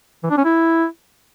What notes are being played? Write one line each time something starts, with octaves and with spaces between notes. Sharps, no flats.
E3
D4
C#4
E4